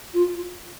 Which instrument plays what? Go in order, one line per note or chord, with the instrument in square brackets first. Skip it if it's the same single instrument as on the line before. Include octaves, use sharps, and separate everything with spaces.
[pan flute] F4